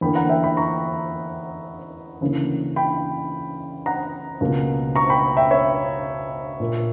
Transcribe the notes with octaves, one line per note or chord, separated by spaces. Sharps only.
E2 D3 A#3 G5 B5
F#5 A#5
E5 G5
G5 B5
A#5 C#6
D2 C#3 E3 A#3
G5 B5
F#5 A#5
C#2 B2 A#3
A#5 C#6
G5 B5
E5 G5
C#5 E5
A#2 A#3